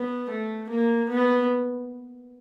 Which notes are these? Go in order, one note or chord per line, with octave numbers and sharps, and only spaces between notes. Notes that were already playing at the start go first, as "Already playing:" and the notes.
Already playing: B3
A3
A#3
B3